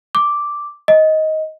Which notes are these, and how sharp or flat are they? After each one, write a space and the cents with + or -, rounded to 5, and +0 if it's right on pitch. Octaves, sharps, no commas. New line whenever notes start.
D6 +0
D#5 +10